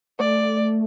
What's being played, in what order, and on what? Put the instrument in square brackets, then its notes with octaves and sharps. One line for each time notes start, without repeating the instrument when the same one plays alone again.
[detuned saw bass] A3 [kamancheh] D5